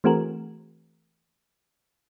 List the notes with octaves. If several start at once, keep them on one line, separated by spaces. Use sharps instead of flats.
E3 A3 C4 F#4 G#4 A#4